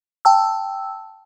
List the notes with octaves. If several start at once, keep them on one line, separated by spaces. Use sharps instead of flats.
G5 A5 E6